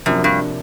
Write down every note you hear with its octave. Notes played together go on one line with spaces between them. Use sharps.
F#2 C3 F3 A#3 D4 F#4
G2